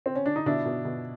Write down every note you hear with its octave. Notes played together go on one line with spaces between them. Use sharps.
C4
C#4
D4
D#4
B2 D4 E4
B2
B2